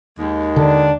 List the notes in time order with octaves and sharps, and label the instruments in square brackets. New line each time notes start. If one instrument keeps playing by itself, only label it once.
[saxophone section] D#2 G#3
[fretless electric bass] D3 [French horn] D4